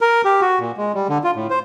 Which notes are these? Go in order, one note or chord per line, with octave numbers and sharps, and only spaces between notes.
A#4
G4
F#4
A#2
G#3
G3
D3
F4
A2
C5